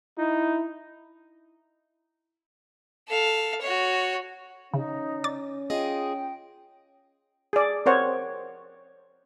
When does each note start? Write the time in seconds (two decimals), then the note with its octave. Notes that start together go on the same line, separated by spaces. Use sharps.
0.18 D#4 E4
3.08 A4 F5
3.61 F#4 C#5
4.74 C#3 C#4 D#4
5.24 D5 A6
5.70 F4 G#4 D#5 G5
7.53 G#4 D5
7.86 C4 A#4 C5 C#5 F#5